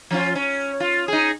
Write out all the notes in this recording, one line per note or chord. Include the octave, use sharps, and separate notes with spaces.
F3 C#4 F4
C#4
F4
D#4 G#4